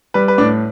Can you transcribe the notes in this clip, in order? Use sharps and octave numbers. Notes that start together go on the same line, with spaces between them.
G3 B4
B4
A2 D4 D5